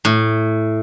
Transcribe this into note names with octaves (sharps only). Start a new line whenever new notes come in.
A2